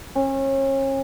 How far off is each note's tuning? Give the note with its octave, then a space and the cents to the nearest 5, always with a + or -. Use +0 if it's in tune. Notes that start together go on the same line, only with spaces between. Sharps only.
C#4 -35